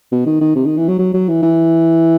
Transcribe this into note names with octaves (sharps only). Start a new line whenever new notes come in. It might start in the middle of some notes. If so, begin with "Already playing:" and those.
B2
D#3
D#3
C3
D#3
E3
F#3
F#3
F#3
E3
E3